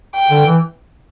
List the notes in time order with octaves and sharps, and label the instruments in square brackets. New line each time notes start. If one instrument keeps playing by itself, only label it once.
[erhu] G5
[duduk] D3
E3